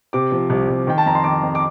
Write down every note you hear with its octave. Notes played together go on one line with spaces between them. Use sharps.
C3 D6
F3
C2
C2
D#3 G5
A5
F2 A#5
C6
D#3 D6
F2
D6